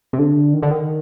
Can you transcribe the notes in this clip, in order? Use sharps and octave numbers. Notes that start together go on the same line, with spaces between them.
C3
D3
D#3
D3
D#3